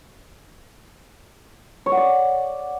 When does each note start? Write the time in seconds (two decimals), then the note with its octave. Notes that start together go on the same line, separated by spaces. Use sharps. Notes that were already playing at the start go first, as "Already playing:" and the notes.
1.86 C#5
1.92 F#5
1.97 D5